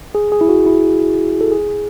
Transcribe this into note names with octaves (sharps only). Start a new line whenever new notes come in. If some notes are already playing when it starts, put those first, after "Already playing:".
G#4
G#4
E4
F#4
E4
A4
G#4